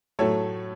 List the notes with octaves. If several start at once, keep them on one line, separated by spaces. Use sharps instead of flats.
A2 F#3 A3 A4 C#5